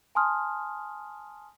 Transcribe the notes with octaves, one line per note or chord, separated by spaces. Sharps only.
G#5 A5 C6 D#6 F6